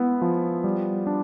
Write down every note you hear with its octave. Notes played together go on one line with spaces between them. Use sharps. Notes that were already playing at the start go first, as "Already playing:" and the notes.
Already playing: G#3 B3 E4
F3
G3
D4